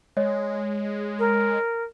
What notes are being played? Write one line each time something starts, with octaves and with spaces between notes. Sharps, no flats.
G#3 C#5 D#5
A#4